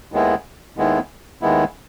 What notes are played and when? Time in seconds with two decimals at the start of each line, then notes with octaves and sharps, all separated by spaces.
0.12 D#2 D#3 G#3 B3 E4
0.77 D#2 D#3 G#3 B3 E4
1.42 D#2 D#3 G#3 B3 E4